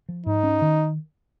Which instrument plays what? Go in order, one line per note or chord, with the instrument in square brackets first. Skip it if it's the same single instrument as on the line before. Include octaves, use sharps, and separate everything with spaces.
[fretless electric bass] F3
[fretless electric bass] G#2 [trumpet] D#4
[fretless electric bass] C#4
D#3